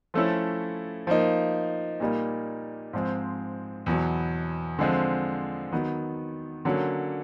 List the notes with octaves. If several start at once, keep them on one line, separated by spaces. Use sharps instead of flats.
F3 A3 C#4 E4 A4
F3 A#3 D#4
A#2 G3 A#3 D#4
G#2 F3 G#3 C4
E2 B2 F#3
D3 F3 G#3 C4
D#3 F#3 B3
D3 F#3 A#3 C#4